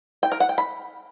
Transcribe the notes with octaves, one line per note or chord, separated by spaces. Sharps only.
G5
A#4
F#5
G5
B5